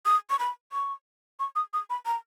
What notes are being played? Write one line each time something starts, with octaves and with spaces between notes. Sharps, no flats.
D#6
C#6
B5
C#6
C#6
D#6
D#6
B5
A#5